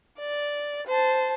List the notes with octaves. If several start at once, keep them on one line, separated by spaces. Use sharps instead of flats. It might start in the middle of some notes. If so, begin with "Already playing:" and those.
D5
C5 A5